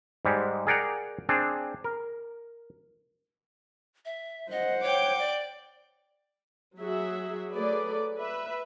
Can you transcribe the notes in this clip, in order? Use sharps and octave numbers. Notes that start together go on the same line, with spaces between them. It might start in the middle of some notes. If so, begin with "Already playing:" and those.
G#2 G3 G#3
G#4 A#4 D5 F#5 G5 A#5
C4 D4 G#4
A#4
E5
C5 D#5 F#5
C#5 G5 D6
D5
F#3 F#4 G#4 E5
F#3 A3 G#4 A4 B4 D5
B4 E5